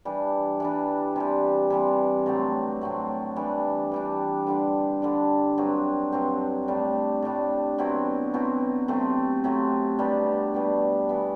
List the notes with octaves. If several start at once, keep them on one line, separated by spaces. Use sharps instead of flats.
E3 G3 D4
E3 G3 D4
C3 E3 G3
C3 E3 G3
A2 F#3 C4
A2 F#3 C4
E3 G3 D4
E3 G3 D4
D3 G3 D4
D3 G3 D4
G2 F#3 C4
G2 F#3 C4
A2 G3 D4
A2 G3 D4
B2 F#3 C4 E4
B2 F#3 C4 E4
C3 F#3 A3 C4
C3 F#3 A3 C4
B2 G3 B3 D4
B2 G3 B3 D4
E3 B3